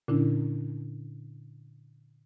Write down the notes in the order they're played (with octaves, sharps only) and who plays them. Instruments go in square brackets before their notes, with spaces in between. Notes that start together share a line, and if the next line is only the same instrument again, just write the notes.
[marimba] A#2 D3 C#4 D4 E4